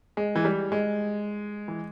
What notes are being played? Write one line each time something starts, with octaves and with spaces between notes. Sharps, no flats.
G#3
E3
G3
G#3
E3